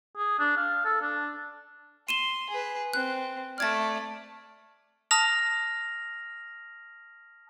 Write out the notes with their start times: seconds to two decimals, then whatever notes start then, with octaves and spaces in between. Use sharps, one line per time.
0.17 G#4
0.39 D4
0.57 F5
0.85 A4
1.02 D4
2.09 C6 D#7 E7 G7
2.50 G#4 B4
2.93 C4 F#6
3.58 A3 D5 F6 G#6 A6
5.11 A5 D#6 F6 A#6 F7